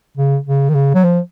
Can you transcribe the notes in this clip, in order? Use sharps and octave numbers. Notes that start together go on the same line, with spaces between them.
C#3
C#3
D#3
C#3
F#3
F3